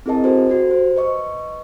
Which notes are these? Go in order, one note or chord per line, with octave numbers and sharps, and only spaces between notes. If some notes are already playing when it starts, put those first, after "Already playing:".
C4 E4 G#4 A#4 D#5 A5
F#4 A4 C5
F#4 G4 C5
C5
B4 D#5 C#6